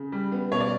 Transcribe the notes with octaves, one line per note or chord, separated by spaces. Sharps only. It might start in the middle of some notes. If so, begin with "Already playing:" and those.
Already playing: C#3
G3
B3
B2 C#5
D5